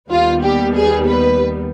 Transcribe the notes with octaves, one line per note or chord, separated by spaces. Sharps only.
D#2 D#3 G3 B3 F4
G4
G#4
B4